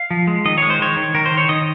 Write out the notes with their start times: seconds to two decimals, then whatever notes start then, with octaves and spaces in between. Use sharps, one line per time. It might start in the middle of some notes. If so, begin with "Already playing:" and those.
Already playing: F5
0.11 F3
0.27 G#3
0.45 D#3 D#5
0.58 G#3 C#5
0.70 C5
0.80 D#3 C#5
0.96 D#3
1.14 D#3 A#4
1.26 C5
1.32 D#3
1.38 C#5
1.49 D#3 D#5